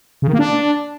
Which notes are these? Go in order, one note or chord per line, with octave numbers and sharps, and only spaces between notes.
C#3
D#3
A#3
D4